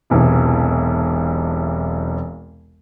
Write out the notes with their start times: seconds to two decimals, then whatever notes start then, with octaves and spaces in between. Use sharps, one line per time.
0.10 E1 B1 C3 E3